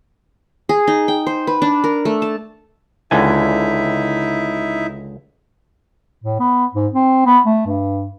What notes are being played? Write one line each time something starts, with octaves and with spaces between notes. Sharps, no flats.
G#4
D#4
G5
C5
B4
D4
A#4
A3
A5
C#2 D3 D#4 E4 E5 G#5
A2
B3
G#2
C4
B3
A3
G2